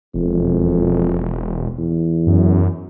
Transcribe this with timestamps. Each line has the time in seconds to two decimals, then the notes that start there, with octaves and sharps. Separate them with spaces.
0.15 E1 F2
1.78 E2
2.27 F#2